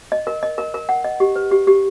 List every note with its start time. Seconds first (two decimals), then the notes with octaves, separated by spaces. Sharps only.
0.12 D#5
0.27 A#4
0.43 D#5
0.58 A#4
0.74 A#4
0.89 F#5
1.04 D#5
1.20 G4
1.36 B4
1.51 G4
1.67 G4